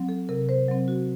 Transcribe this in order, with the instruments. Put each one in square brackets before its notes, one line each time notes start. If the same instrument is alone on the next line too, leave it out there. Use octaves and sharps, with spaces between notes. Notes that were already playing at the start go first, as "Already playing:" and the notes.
Already playing: [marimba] F#3 C4
A4
C3 A#4
C5
F#3 C4
F#4